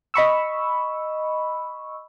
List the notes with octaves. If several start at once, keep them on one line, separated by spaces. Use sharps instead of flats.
D#5 B5 C#6 E6